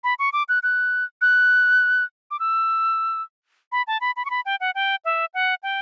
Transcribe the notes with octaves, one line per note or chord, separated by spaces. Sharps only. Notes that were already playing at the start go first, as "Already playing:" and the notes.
B5
C#6
D6
F#6
F#6
F#6
D6
E6
B5
A5
B5
B5
C#6
B5
G5
F#5
G5
E5
F#5
G5